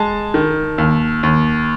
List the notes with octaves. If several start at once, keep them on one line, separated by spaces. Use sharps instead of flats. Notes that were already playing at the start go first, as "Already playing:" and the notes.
Already playing: G#3 A5
D#3
D#2
D#2